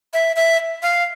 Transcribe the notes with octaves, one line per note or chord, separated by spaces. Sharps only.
E5
E5
F5